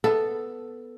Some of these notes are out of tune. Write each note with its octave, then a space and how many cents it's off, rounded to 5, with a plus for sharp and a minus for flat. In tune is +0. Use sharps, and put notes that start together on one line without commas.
B3 +0 A4 +0